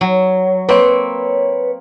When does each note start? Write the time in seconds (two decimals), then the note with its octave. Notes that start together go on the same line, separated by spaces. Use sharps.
0.01 F#3
0.69 A#3 C4 B4 C#5